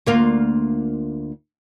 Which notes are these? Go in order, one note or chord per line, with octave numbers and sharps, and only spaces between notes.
D2 A#3 F4